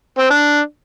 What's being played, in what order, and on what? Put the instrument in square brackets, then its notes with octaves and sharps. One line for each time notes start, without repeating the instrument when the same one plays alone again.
[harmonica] C4
D4